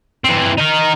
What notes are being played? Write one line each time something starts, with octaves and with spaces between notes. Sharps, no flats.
E3 C4
D#4 A#4